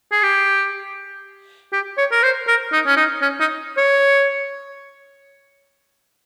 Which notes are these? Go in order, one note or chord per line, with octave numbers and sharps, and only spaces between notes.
G#4
G4
G4
C#5
A#4
C5
A#4
D#4
C#4
D#4
C#4
D#4
C#5